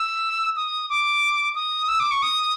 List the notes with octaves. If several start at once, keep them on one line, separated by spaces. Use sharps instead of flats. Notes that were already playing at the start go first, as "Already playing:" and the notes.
Already playing: E6
D#6
D6
D#6
E6
D6
C#6
D#6